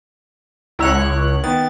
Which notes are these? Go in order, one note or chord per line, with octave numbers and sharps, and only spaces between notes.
C#2 E4 C#5 A#5 E6 F#6
D#3 B3 A6